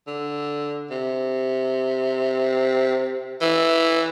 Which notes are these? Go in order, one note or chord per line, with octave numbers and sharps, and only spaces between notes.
D3
C3
E3